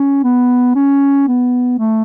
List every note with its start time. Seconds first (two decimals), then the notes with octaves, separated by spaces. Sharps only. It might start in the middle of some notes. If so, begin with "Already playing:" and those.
Already playing: C#4
0.24 B3
0.75 C#4
1.28 B3
1.79 A3